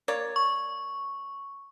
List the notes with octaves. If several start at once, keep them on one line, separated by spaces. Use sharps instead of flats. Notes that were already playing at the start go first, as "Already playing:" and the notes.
A#3 C#5 D5
C#6